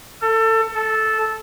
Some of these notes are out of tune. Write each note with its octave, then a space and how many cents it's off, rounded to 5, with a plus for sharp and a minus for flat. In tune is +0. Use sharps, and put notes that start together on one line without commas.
A4 +25
A4 -10